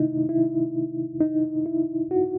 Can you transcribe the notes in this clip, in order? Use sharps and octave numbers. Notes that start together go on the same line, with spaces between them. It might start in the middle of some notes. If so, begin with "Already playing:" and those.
Already playing: C3 D#3 A3 D#4 E4
E4
D#4
E4
F#4